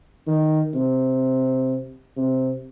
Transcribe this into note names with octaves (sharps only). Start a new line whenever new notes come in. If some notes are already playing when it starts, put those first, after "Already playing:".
D#3
C3
C3